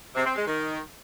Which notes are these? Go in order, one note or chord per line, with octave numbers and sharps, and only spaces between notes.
C3
C4
G#3
D#3